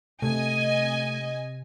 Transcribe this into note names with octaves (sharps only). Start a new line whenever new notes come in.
C3 A3 D#5 G#5